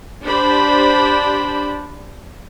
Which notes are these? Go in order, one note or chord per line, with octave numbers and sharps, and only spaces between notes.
D4 G4 C5 B5